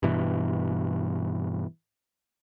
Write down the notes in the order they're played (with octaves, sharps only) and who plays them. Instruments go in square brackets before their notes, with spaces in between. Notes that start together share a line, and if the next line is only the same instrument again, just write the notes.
[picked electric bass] G2 B2 E3